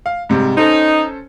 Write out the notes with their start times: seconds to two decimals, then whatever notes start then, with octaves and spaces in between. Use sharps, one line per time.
0.06 F5
0.30 G#2 C3 G3
0.57 C#4 D#4 A4 C5